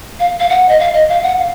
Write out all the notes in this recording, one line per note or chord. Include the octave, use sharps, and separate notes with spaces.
F5
F5
F#5
D#5
F5
D#5
F5
F#5
F5